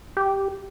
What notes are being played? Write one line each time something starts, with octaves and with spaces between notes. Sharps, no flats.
G4